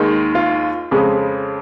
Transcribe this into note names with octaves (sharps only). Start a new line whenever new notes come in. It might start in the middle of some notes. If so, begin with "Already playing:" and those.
Already playing: D#2 D#3 G#3
F4
F2 C#3 G#3